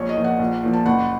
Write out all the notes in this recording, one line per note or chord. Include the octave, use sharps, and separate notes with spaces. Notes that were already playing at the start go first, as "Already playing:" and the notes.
Already playing: A#1 C#5
D#5
A#2 F3
F#5
A#1
A#2 F3
A5
F#1 F#5